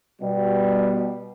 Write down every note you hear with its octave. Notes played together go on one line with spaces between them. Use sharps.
B2 G3